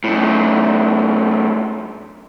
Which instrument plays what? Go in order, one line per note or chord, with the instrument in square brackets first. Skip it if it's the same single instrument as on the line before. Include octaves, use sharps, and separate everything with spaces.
[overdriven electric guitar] F#2 A2